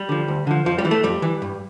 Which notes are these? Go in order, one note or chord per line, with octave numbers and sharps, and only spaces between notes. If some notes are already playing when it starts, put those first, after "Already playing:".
Already playing: G3
D3 F3
D2
D3 F3
F2 F3
G3
E3
A3
F2 G3
E3
G2